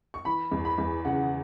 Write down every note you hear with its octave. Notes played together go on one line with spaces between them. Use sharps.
C#6
E3 B5
E2
B5
E2
C#3 F#5